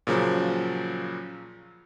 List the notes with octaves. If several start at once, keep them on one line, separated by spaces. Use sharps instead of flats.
A#2 C#3 F3 F#3